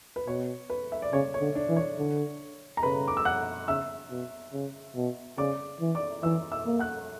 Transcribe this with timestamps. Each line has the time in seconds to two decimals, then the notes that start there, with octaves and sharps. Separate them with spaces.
0.16 B4
0.27 B2 C#5
0.70 B4
0.92 E5
1.02 D5
1.13 C#3 C#5
1.34 C#5
1.41 D3
1.55 D4 D5
1.69 E3
1.77 C#5
1.98 D3
2.77 A#5
2.83 C#3 B4 B5
3.08 D6
3.17 E6
3.25 F#5 F#6
3.68 C#3 E5 E6
4.10 B2
4.53 C#3
4.96 B2
5.38 C#3 D5 D6
5.81 E3
5.95 D5 D6
6.23 E3 E5 E6
6.52 E5 E6
6.66 A#3
6.79 F#5 F#6